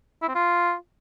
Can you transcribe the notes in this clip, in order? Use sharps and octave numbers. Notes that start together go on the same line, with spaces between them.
E4
C4
F4